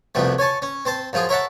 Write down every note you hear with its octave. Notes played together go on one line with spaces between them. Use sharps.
C2 F2 B2 G3 A3
C#5 G#5 A5 C#6
C#4
C4 C5 A5
F#2 F3 F4 G#4
A#4 C#5 E5 F#5 A5